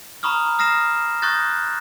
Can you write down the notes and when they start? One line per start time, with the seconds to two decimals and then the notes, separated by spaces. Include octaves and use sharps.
0.23 A#5 B5 C#6 D#6 F6
0.59 D#6 F6 A#6 C7 E7
1.22 C#6 D#6 F#6 G6 A6 A#6